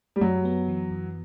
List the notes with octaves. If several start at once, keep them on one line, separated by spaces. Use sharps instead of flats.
G3
F#2 F#3
B3
E3
F#2